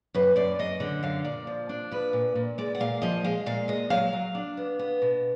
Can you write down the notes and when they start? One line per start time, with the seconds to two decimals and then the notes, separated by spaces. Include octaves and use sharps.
0.14 F#2 B4
0.36 F#2 D5
0.59 F#2 D#5
0.80 D3
1.03 F#2 F5
1.24 A#2 D5
1.47 F3
1.69 D4
1.91 F3 B4
2.13 A#2
2.35 A#2
2.58 G#3 D5
2.75 F#5
2.80 A#2 F5
3.02 F3 D#5
3.24 G#3 F5
3.46 A#2 F5
3.68 G#3 D#5
3.90 F#3 F5
4.13 F#3
4.35 D4
4.57 B3
4.79 B3
5.02 B2